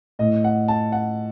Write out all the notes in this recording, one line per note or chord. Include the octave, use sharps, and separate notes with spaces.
A2 D#5
F#5
A5
F#5